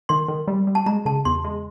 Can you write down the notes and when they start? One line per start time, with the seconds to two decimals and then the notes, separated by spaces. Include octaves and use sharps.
0.09 D#3 C6
0.28 D#3
0.48 G3
0.67 G3
0.75 A5
0.86 G#3 A#5
1.05 C#3 A5
1.25 E2 C6
1.44 G#3